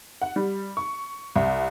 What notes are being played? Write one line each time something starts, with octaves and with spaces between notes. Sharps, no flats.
F#5
G3
C#6
C2